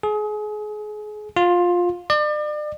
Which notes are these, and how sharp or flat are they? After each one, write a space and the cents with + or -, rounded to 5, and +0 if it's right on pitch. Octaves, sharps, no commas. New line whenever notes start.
G#4 +30
F4 +15
D5 +35